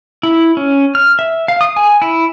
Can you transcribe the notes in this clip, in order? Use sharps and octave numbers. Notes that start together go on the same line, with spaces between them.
E4
C#4
F6
E5
F5
D#6
G#5
E4